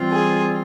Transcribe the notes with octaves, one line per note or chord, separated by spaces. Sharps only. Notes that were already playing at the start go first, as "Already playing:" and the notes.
Already playing: E3 G3 C4 F4
G#4